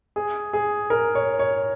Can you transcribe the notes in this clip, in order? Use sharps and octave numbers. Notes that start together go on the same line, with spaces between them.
G#4
G#4
A#4
C#5
C#5